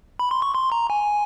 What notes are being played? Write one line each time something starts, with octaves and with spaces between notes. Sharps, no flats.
B5
C6
C#6
C6
A#5
G#5